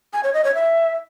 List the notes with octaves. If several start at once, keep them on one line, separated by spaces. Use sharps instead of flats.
G#5
C#5
D#5
C#5
E5